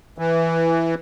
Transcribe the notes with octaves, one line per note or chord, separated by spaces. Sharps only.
E3